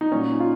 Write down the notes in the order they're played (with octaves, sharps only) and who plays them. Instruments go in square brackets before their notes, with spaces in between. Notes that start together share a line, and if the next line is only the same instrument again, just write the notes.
[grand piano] D#4
A#2 F#3 C#4
D#4
F4